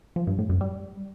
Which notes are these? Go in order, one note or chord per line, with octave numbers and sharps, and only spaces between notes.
F3
G2
A2
F#2
G3